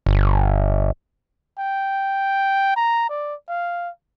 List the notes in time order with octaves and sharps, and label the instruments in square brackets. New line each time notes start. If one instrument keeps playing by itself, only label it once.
[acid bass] G1
[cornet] G5
A#5
D5
F5